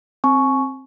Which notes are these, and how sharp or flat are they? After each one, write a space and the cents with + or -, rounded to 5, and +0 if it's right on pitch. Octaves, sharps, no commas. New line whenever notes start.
C4 +15 G#5 +35 C#6 +0